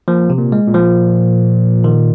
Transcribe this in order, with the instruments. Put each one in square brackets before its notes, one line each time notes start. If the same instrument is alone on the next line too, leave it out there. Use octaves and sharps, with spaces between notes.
[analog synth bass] A#2 [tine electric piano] F3
[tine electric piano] C3
[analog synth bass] A#2
[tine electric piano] G#3
[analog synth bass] A#2
[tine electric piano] F3
D#3